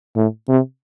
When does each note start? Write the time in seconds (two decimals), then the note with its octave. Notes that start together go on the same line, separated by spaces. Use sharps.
0.16 A2
0.49 C3